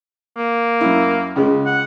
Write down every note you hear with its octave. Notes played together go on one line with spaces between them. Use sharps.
A#3
F#2 E4
C#2 C#3 G#3
F#5